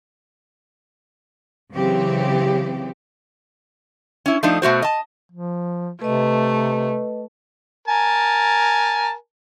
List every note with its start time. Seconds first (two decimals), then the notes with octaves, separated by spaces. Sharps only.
1.73 C#3 E3 F#3 C4 G4
4.26 C#4 E4
4.43 F3 A3 D4 D#4
4.62 B2 A3 F#4 C5
4.82 D#5 A5
5.32 F3
6.02 C3 A3 B4 D#5
7.88 A#4 G#5 A5